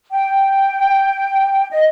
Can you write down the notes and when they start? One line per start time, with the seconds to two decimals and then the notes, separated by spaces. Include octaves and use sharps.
0.12 G5
1.71 D#5